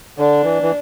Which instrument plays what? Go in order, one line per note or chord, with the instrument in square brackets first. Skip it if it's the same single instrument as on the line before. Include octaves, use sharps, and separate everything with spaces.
[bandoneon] D3 [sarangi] D4
[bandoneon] E3
E3